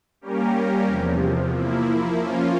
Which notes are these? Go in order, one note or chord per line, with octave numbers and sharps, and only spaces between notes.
G3 A#3 C#4 G4 A#4
E2 C3 F3
F3 A#3 E4
F3 A#3 C#4 F4